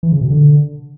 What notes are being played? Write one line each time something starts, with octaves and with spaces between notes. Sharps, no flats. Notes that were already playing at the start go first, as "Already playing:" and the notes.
E3
C#3
B2
D3